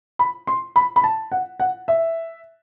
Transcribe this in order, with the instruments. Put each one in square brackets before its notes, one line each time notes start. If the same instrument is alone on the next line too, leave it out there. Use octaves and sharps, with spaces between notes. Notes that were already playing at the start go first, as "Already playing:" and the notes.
[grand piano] B5
C6
B5
B5
A5
F#5
F#5
E5